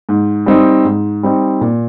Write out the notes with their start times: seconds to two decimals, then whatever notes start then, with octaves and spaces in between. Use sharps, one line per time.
0.09 G#2
0.46 G3 C4 D#4
0.85 G#2
1.23 G3 C4 D#4
1.61 A#2